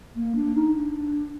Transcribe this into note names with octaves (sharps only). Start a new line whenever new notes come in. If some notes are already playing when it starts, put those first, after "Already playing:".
A#3
D4
D#4
D4